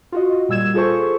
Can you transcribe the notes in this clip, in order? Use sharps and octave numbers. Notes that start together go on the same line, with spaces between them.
F4 F#4 D#5
A#2 G3 E6 G#6 E7
F4 G#4 A4 C5 C#6